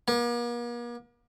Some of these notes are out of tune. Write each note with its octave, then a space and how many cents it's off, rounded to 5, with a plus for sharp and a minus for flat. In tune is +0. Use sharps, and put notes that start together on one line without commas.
A#3 +45